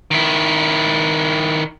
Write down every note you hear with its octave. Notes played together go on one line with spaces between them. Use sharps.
D#3 E4